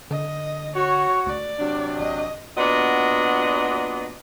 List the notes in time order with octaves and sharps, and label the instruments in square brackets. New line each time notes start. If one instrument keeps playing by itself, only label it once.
[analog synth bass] D3 [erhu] D#5
[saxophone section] F#4 [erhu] C#5
[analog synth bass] D2 [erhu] D5
[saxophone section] C3 F#3 D4
[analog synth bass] A1 [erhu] D#5
[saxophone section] A#2 B3 D4 F#4 D#5